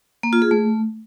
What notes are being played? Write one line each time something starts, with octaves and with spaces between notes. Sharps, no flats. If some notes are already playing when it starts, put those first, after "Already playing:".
A#3
F4
G#4
A3